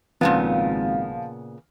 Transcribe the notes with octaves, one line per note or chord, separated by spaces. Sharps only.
G#1 A#2 C#3 F3 B3 F5